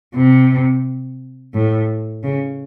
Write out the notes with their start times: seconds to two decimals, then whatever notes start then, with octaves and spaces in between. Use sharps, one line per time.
0.15 C3
1.54 A2
2.23 C#3